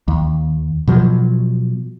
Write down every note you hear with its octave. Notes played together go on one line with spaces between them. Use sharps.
D#2
B2 F3 F#3